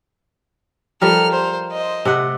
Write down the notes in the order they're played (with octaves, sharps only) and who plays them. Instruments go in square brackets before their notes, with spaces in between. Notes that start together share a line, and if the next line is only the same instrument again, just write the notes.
[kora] F3 G3 A#4 [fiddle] A4 F6
[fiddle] C5
C5 D#5
[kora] C3 A3 F#5